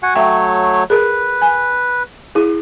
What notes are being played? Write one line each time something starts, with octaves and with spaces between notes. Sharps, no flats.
F#4 F#5 G#5
F#3 A3 C#5 E5 G5
G#4 A#4 B4
G#5
E4 G#4